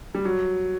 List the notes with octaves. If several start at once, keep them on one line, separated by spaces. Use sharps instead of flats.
G3
F#3